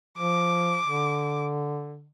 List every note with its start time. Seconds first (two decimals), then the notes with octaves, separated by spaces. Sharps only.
0.18 F3 D6
0.84 D3